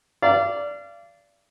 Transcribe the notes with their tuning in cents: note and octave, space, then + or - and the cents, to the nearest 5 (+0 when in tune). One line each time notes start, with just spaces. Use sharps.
D5 -15 F5 -35